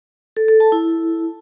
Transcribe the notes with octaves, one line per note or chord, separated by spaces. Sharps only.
A4
A4
A5
E4